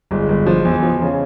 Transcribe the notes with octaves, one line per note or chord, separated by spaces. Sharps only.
G1 G#3
G1
F3
E2
F3
C#3